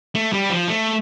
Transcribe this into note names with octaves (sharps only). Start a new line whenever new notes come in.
A3
G3
F3
A3